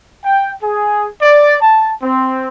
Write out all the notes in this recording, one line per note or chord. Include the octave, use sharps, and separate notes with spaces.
G5
G#4
D5
A5
C4